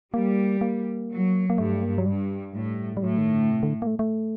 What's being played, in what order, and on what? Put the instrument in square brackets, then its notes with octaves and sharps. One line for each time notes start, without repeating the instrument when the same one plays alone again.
[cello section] G3 [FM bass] A#3
[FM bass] A#3
[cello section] F#3
[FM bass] A#3
[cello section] G2 [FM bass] A3
[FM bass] A#3
F#3
[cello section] G2 [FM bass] G3
[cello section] A2
[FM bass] G3
[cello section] A2 [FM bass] F#3
[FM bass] D#3
D3
C3
D3
A#3
A3
A3